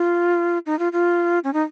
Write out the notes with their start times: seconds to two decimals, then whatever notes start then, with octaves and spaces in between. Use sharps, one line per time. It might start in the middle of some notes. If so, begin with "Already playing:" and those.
Already playing: F4
0.66 D#4
0.79 F4
0.93 F4
1.44 C#4
1.53 D#4